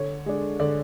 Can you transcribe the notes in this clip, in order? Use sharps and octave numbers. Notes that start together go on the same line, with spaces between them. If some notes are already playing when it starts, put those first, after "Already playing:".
Already playing: D3 C#5
G#3 D4
D3 D5